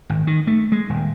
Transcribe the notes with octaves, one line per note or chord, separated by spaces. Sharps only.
G#1
D#3
A3
G#3
D#1